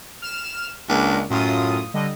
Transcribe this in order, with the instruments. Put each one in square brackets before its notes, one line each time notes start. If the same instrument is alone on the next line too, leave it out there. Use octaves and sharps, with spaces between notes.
[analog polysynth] F6 E7
[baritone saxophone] C#2 [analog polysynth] G#3 A#3 D4
[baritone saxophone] F#2 [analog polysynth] A2 F4 D#6
[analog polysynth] D3 G3 D#5